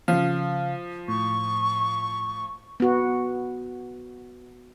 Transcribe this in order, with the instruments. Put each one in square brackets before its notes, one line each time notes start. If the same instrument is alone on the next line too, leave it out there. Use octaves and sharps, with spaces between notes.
[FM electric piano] C#3 F5 [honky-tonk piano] F3
[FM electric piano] A2 [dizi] C#6
[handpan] B3 F#4